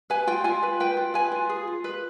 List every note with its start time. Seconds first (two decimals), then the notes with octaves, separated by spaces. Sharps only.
0.10 B4 G#5
0.27 F4 G5
0.44 F4 G#5
0.63 B4
0.80 B4 G5
0.97 F4
1.14 B4 G#5
1.32 F4
1.49 G#4
1.67 F4
1.84 B4